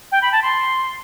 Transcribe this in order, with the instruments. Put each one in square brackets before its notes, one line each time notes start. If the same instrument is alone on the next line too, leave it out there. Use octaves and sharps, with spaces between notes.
[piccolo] G5
B5
A5
C6